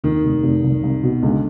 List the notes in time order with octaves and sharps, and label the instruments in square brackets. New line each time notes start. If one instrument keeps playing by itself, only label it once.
[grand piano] D#2 [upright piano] D#3
[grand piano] F1
F1
C2
C2
B2
[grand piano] C#2 [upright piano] D3